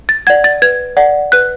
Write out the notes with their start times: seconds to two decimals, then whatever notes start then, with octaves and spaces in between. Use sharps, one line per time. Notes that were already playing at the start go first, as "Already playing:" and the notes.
0.09 A6
0.27 D5 F#5 G#6
0.44 A6
0.62 B4 G#6
0.97 D5 F#5
1.32 B4 F#6